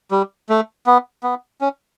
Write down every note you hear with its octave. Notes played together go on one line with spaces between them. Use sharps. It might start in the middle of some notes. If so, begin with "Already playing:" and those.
G3
A3
B3
B3
C#4